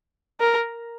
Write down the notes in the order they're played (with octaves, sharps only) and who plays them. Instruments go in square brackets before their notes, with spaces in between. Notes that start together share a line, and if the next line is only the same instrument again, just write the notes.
[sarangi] A#4